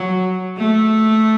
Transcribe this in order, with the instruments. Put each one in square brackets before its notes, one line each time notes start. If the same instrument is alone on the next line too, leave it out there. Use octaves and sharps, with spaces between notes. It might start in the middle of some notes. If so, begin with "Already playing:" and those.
Already playing: [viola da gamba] F#3
A3